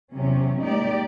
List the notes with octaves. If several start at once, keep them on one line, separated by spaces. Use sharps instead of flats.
E2 C3 F#3 C#4
G#3 A#3 D#4 G4 D5